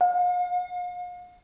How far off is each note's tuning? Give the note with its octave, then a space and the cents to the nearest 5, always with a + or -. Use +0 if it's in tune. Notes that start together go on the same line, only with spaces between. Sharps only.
F5 +45